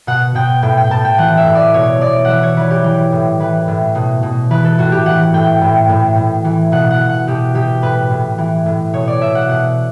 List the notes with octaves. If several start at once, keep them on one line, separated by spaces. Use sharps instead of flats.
B2 F#5
B2 G5
A2 G5
G5
A2 A5
G5
E3 F#5
E5
A2
D5
B2 C#5
B2 D5
E3 E5 F#5
C#5
E3 B4
G4
E3
A2
E3 B4
A2
B2
B2
E3 B4
A4
A2 F#4
G4
E3 F#5
A2 G5
A2
A2
A2
E3
B2 F#5
F#5
B2
F#5
B2 G4
B2 G4
A2 B4
A2
E3
A2
B2 C#5
D5
B2 E5
F#5
B2 F#5